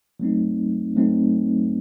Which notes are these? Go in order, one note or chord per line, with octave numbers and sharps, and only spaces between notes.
F#3 A3 C4 D#4
F#3 A3 C4 D#4